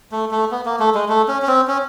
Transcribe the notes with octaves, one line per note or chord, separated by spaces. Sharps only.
A3
A3
B3
A#3
A3
G#3
A3
C#4
C#4
C4
C#4